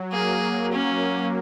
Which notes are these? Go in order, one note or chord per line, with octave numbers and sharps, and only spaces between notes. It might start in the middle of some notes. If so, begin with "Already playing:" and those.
Already playing: F#3
A#3 G#4
C#4